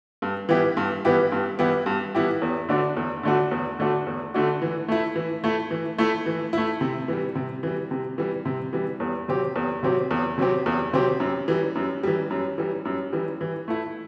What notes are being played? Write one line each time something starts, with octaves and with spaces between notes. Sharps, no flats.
G2
E3 B3 E4 G4
G2
E3 B3 E4 G4
G2
E3 B3 E4 G4
G2
E3 B3 E4 G4
E2
D3 A3 D4 F#4
E2
D3 A3 D4 F#4
E2
D3 A3 D4 F#4
E2
D3 A3 D4 F#4
E3
A3 E4
E3
A3 E4
E3
A3 E4
E3
A3 E4
C3
E3 G3
C3
E3 G3
C3
E3 G3
C3
E3 G3
E2
C3 F#3 C4 G4
E2
C3 F#3 C4 G4
E2
C3 F#3 C4 G4
E2
C3 F#3 C4 G4
F#2
E3 G3
F#2
E3 G3
F#2
E3 G3
F#2
E3 G3
E3
A3 E4